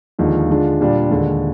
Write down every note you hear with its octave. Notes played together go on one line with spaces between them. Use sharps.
D#2 D3 F3 G#3 D#4
D3 G#3 D4 F4
A#2 G3 D4 F4
D#2 D3 G#3